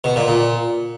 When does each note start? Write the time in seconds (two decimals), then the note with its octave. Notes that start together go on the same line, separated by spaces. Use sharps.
0.04 B2
0.16 A#2
0.28 A#2